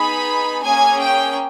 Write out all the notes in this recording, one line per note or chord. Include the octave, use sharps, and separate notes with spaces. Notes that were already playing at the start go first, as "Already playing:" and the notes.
Already playing: B3 D#4 G#4 B5
A#3 C#4 G#4 G#5
G5